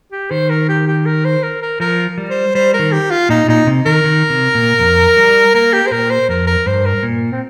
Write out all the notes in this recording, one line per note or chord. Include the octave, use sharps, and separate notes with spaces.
G4
D#3 C5
A#4
G4
G4
A#4
C5
A#4
A#4
F3 A#4
G3
C5
G3 C5
A#4
D#3
G4
F4
A#2 D#4
A#2 D#4
C3
D#3 A#4
D#3
C3
A#2
F2
G3
A#3 A#4
G4
C5
A#2 A#4
C5
F2 A#4
A#4
G2 C5
A#4
A#2
C4